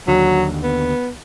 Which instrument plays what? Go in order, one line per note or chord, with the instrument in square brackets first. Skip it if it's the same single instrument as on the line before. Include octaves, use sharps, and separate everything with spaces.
[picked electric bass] D#2 D3 [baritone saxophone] F#3
[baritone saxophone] B3